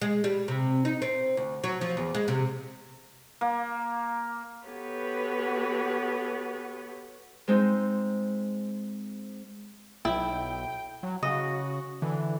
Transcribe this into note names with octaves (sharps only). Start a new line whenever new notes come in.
G#3
G3
C3
D#4
C4
D2
F#3
F3
E2
G#3
C3
A#3
B3 F#4 G4 A4 B4 C#5
G#3 C4 D#4
B1 E4 G5
F#3
C#3 F#4 D#5
D3 E3